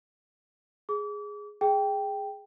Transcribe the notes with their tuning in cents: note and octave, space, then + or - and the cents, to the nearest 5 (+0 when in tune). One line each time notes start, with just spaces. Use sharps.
G#4 +0 D6 -35
G#4 +0 G5 +0